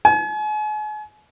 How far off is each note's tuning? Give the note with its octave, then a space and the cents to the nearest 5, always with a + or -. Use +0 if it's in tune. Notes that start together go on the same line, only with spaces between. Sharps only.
G#5 +40